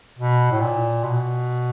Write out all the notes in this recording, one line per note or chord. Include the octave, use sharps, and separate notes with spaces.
B2
A2
A#2
B2